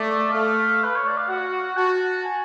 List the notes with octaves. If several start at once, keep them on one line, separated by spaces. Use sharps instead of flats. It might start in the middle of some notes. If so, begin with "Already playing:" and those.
Already playing: A3 D5
A3 F5
B4
C#5
D5
F5
F#4 F#5
F#4 A5
G#5